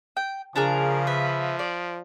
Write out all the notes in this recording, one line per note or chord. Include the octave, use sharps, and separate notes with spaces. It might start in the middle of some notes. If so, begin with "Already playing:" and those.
G5
C#3 F3 D4 G#4 A#4
B4 E5
D5